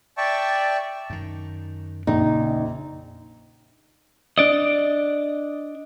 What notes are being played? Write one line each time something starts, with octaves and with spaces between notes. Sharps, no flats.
D5 E5 G5 A5 C#6
F#2 D#3
A#1 F2 C#3 D4 D#4
D4 D5 D#5